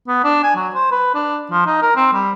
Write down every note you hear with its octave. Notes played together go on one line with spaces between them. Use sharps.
B3
D4
G#5
F#3
C5
B4
D4
F3
D#4
A#4
C4
G3